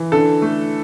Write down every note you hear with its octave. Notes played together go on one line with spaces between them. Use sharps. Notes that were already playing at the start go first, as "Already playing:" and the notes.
Already playing: E3
D3 A4
A3